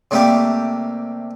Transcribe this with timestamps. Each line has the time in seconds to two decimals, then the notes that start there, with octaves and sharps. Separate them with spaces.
0.11 C3 G3 A3 A#3 G4